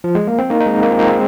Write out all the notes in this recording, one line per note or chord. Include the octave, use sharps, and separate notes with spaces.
F3
G#3
A#3
C4
A#3 D#4
D#4
G#3 C4
A#3 D#4
C4 F4
A#3 D#4
G#3 C4